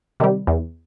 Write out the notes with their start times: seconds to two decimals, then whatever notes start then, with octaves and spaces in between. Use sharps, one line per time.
0.20 C3 D#3 G3
0.47 E2